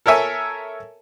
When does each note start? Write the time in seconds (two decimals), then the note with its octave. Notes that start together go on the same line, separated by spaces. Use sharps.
0.06 A4 A#4 C#5 E5 G#5